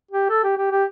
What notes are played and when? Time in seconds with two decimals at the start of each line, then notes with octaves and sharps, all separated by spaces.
0.11 G4
0.29 A4
0.43 G4
0.57 G4
0.72 G4